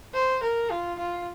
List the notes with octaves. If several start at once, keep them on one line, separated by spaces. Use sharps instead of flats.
C5
A#4
F4
F4